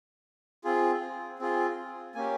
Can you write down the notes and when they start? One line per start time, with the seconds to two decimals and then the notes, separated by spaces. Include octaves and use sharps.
0.65 C4 F4 G#4
1.39 C4 F4 G#4
2.15 A#3 C#4 G4 G#5